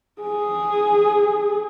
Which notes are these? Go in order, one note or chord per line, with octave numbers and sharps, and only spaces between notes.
G#4